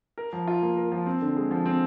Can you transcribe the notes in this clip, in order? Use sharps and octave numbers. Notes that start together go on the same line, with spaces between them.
A#4
F3
F4
A#3
A#4
F3
C4
D3
G#3
F3
C4